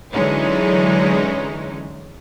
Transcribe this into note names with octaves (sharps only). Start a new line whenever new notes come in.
D3 E3 F#3 G#3 C#4 D#4